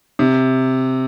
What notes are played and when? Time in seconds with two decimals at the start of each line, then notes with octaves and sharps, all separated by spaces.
0.19 C3